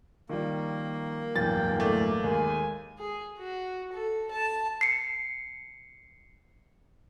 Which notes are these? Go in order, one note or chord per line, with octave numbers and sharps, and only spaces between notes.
D#3 F3 G3 A#3
D1 G1 E2 G5 A6
A3 D5
D#2 G#3 G#5
G#4
F#4
A4
A5
C7 C#7